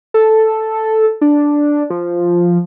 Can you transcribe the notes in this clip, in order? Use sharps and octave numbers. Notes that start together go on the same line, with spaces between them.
A4
D4
F3